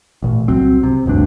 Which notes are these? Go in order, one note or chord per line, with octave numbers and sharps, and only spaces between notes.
A1 A#2
C2 F#3 C4
C3
G1 D2 G2 D4